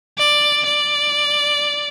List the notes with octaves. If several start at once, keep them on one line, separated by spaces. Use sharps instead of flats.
D5
D5